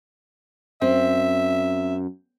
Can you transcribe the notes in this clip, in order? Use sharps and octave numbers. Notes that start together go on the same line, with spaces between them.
F#2 C4 E5